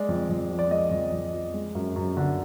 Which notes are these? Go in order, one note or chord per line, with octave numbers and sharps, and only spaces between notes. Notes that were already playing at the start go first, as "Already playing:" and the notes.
Already playing: G#3 D5
F2
F2
F3
D5
G#3 D#5
F2
F2
F3
G#3
F#2
F#2
D3